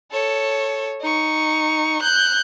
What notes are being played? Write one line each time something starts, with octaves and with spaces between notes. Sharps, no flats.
A4 C#5
D#4 C#6
F#6 G6